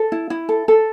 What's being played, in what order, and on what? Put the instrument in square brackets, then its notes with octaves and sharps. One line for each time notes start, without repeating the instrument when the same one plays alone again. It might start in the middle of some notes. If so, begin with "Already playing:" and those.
Already playing: [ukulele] A4
E4
E4
A4
A4